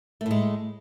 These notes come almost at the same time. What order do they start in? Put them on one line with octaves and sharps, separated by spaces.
A3 A2 G#3